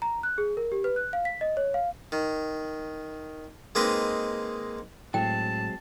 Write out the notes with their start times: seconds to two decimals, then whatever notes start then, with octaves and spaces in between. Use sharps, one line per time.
0.02 A#5
0.23 F#6
0.38 G#4
0.57 A#4
0.72 G4
0.84 B4
0.96 F#6
1.13 F5
1.25 B6
1.41 D#5
1.57 C#5
1.74 F5
2.12 D#3
3.75 G#3 A#3 C4 D#4 B4
5.14 A2 F#3 G#3 C4 G5 A5